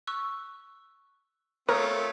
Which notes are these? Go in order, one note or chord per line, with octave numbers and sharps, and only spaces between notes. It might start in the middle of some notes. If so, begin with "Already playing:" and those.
C#6 E6 F#6
A3 C4 F4 A#4 C#5 D#6